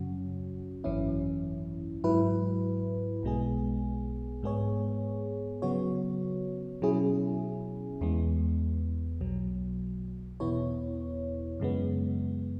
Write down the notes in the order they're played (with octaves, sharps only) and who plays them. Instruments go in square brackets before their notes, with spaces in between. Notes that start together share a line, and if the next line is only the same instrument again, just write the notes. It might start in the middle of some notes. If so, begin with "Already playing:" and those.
Already playing: [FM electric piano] F#2 C#3 F#3 C#4 F#4
G#1 F#2 E3 C#4 E4
G#2 F#3 E4 B4
B1 B2 G#3 B3 G#4
G#2 G#3 B3 G#4 C#5
C#3 F#3 B3 F#4 C#5
B2 F#3 C#4 E4 G#4
E2 E3 G#3 B3
B1 B2 F#3
E2 B2 B3 E4 C#5
F#2 C#3 G#3 B3